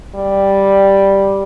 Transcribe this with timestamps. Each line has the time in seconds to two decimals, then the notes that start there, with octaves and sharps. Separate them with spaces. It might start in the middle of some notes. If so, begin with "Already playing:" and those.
0.16 G3